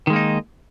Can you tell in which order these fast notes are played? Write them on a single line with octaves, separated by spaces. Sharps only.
D#3 G#3 A#3 D#4